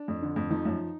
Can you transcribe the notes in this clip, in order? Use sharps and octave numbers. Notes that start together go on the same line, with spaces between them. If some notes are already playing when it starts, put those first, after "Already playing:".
Already playing: D4
F2
D3
F2
F3 D#4
F#2